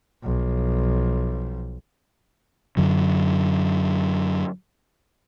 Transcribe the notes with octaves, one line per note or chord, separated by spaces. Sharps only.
B1 F3
F#2 D3 F#3